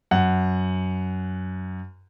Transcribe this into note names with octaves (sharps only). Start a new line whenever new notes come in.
F#2 F#5